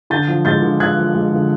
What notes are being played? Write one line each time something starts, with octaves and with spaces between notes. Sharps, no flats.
D3 G6 A6
F3
G#3 G6 A6
D3
D3 F#6 G#6
F3
G#3
D3